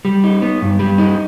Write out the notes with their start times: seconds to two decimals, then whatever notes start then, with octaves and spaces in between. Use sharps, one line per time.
0.05 G3
0.24 D#4
0.42 B3
0.62 G2
0.79 G3
0.98 D#4